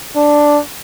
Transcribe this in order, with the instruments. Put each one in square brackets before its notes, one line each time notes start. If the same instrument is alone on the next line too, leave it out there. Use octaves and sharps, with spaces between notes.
[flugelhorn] D4